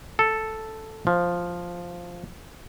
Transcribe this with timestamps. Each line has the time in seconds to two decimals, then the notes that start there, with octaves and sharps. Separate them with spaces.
0.19 A4
1.07 F3